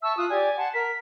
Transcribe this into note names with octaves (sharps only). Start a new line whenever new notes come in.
E5 A5 C#6 E6
F4 D#6 F#6
G4 D5 G#5
F#5 A5 C6
A#4 B6